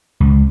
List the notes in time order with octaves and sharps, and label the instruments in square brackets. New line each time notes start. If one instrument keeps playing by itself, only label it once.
[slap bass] C#2